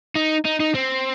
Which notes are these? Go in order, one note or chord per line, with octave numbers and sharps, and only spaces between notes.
D#4
D#4
D#4
C4